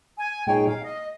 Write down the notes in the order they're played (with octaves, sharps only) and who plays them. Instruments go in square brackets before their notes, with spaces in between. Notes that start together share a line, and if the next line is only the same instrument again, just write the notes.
[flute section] G#5
[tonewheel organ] A#2 G#3 D#4 G#4 C#5 [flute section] G5
[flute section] F5
D#5